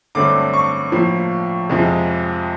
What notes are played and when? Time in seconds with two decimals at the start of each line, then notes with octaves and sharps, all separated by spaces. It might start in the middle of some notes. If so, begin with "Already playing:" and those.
0.15 G2 D3 F#3 A3 C4 D6
0.54 C#6
0.92 A2 F3 A#3
1.70 F2 C3 F3 G#3